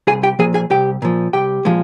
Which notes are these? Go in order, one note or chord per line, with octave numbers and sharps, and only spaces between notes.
C2 G#4 G#5
G4 G5
A#2 F3 G#4 G#5
G#4 G#5
C2 G4 G5
A#2 F3
C2 G4 G5
A#2 F3 G#3